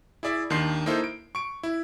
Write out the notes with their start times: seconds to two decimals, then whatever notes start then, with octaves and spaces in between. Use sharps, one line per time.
0.23 E4 G#4 D5 E5
0.50 D#2 D#3 D4 D#4 C6 C7
0.86 A#3 D#4 E4 A4 C5
1.04 D7
1.35 C#6 D7
1.63 E4